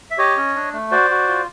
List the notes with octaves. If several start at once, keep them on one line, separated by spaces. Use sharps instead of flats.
E5
G4 C#5 D#5
C#4
D4
A3
F#4 C5 D5
F#4
F4